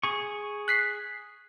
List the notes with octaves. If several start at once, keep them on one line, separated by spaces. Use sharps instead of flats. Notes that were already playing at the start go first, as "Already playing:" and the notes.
G#4 C#6
F#6 B6 C7